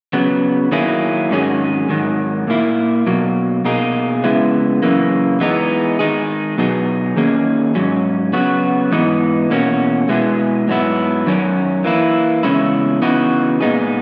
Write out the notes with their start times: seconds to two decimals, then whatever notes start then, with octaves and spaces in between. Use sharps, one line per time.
0.13 C#3 F#3 B3
0.72 D#3 F#3 A#3 E4 G#4
1.31 G#2 D#3 F#3 C#4 G#4
1.89 G#2 D#3 F#3
2.48 A#2 A#3 E4
3.07 B2 F#3 A#3
3.65 B2 A#3 D#4 G#4
4.24 C#3 G#3 B3 E4
4.82 F#2 C#3 E3 A#3
5.40 E3 G#3 B3 D#4
5.99 D#3 G#3 D#4 G#4
6.58 B2 F#3 B3 D#4 G#4
7.17 D#3 A#3 C#4 G#4
7.75 G#2 F#3 C#4
8.33 C#3 F#3 B3 F#4
8.92 G#2 E3 B3 D#4
9.50 E2 B2 A#3 C#4 F#4
10.08 B2 G#3 B3 E4 G#4
10.67 G#2 F#3 B3 E4
11.27 F#2 D#3 F#3 C#4
11.84 E3 A#3 E4
12.43 E2 C#3 G#3 C#4 E4
13.02 C#3 E3 B3 D#4 F#4
13.61 A#2 G#3 B3 D#4 G#4